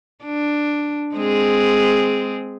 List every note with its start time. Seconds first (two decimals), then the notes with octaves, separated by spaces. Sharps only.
0.25 D4
1.15 G#3 C4 G#4